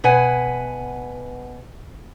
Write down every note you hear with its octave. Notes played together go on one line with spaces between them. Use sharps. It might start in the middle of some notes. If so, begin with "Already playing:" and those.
B2 B4 F#5 G#5